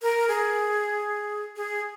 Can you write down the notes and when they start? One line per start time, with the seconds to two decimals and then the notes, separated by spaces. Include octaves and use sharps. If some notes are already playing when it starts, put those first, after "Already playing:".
0.02 A#4
0.28 G#4
1.56 G#4